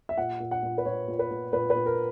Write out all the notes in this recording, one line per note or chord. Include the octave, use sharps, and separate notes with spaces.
E5
A#2 F#5
A#2
F#5
A#2
B4
A#2 C#5
A#2
B4
A#2
A#2 B4
B4
A#2
A#4